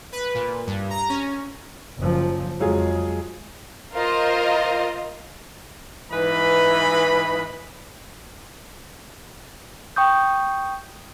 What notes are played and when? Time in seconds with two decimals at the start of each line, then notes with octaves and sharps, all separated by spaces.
0.12 B4
0.35 A#2
0.67 G2
0.90 A#5
1.09 C#4
1.99 F#1 F3
2.60 F2 F#3 G#3 F4 G#4
3.93 F4 A#4 C5 D#5
6.12 G#2 E3 B4 D#5 B5
9.96 G5 C#6 D#6 G6